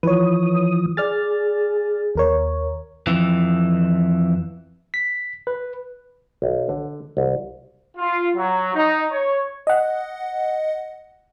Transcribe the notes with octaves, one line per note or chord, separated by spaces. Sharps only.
E3 F3 B4 C#5 D#6
G#4 D5 F6 A6
D#2 A#4 C#5
F2 E3
B6
B4
B1
D3
C2
F4
F#3
D#4
C#5
D#5 F#5